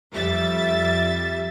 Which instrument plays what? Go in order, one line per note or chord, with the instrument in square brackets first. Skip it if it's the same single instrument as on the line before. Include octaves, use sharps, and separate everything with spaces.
[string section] F2 G3 E5 A6